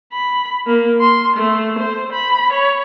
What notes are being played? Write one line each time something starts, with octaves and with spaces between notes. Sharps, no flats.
B5
A#3
C6
A3
C5
B5
C#5